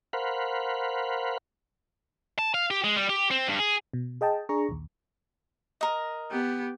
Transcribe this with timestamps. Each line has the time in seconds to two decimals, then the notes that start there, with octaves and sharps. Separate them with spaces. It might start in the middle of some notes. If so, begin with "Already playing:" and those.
0.13 A#4 C5 F5 F#5 B5
2.39 A5
2.54 F5
2.71 G4
2.84 G#3
2.96 G3
3.09 G4
3.31 C4
3.47 G2
3.59 G#4
3.93 B2
4.21 G#4 D#5 G5 A5
4.49 D4 G#4 A#5 C#6
4.69 A#1 D#2
5.81 A#4 D#5
6.31 B3 G4